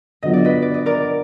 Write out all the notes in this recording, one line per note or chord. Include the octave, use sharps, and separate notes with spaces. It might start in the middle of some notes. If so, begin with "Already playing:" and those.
D3 F#3 B3 F4 D#5
D5
B4 D#5
D5
D#5
A#4 D5